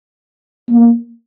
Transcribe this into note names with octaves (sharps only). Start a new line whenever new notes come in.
A#3